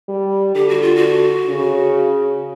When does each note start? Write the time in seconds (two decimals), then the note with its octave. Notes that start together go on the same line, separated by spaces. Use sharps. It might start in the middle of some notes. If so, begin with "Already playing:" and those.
0.08 G3
0.55 D3 G4
0.69 F#4
0.82 F4
0.96 F#4
1.49 C#3